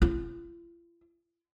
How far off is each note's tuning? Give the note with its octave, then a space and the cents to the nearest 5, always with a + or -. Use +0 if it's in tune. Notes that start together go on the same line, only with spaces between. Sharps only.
F4 -45